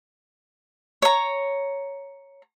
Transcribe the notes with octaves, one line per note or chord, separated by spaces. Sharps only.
C#5 A#5